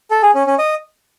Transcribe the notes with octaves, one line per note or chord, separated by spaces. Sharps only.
A4
G#4
C#4
C#4
D#5